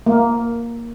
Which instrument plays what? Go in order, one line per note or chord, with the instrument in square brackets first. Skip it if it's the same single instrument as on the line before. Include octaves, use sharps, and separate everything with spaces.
[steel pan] A#3